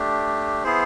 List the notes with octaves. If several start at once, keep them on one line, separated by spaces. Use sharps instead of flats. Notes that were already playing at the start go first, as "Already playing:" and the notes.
Already playing: A3 D4 G4
B3 E4 G#4 C5